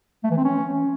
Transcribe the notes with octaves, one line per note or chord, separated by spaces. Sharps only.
A3
E3
C4
C#4